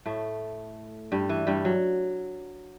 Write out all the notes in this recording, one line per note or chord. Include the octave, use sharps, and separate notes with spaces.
A2 A3
G2 G3
E3
G2 G3
F#3